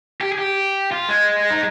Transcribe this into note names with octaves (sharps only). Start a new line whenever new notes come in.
G4
G#4
G4
F4
G#3
D#4